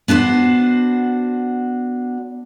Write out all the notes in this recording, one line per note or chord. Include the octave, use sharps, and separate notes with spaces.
B3 D4 F#4 C5